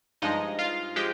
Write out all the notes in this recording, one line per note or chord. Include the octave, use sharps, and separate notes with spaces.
G2 F3 G#3 D#4 D#5
F4 F5
F3 G#3 G4 G5